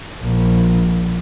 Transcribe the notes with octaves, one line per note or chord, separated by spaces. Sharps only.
A#1